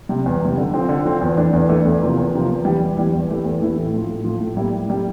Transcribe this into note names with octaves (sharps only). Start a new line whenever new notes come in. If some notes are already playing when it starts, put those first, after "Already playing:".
C3 G3
E2
C3 G3
D3
F3 C4
D3
F3 C4
E2
E3 A3 D4
E2
E3 A3 D4
E2
C3 F3 A#3
E2
C3 F3 A#3
E2
E3 G3
E2
E3 G3
E2
E3 A3 E4 G4
E2
E3 A3 E4 G4
A2
F3 A3
A2
F3 A3
A2
G3 A#3 E4
A2
G3 A#3 E4